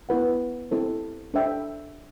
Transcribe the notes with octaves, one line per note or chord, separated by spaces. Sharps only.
B3 E4 B4 F#5
C4 E4 A4 C5
D4 A4 C5 E5 G5